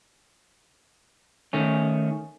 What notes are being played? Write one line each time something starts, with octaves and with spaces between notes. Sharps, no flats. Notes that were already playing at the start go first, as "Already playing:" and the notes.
D#3 A3 C#4